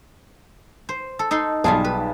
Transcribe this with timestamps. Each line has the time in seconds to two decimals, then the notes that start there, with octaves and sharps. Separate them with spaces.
0.89 C5
1.19 A4
1.31 D#4 A4 C6
1.64 B1 G3 F4 G#4 A5
1.84 B4